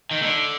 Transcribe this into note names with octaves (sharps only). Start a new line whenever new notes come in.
D#3
D3